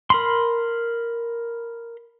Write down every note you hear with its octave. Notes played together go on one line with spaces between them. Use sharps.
A#4 B5 C6